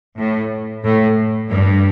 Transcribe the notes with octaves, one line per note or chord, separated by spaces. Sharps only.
A2
A2
G2